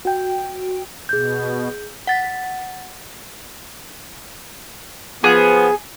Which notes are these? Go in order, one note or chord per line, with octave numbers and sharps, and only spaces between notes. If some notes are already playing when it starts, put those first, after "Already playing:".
F#4 G5
B2 G#4 G6
F#5 A6 B6
F3 B3 G#4